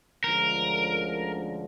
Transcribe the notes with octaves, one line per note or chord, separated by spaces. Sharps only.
D2 D3 F3 G#3 C#4 A#4